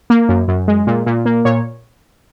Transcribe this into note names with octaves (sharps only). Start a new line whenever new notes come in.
A#3
F#2
F#2
G#3
A#2
A#2
A#3
A#2 C#5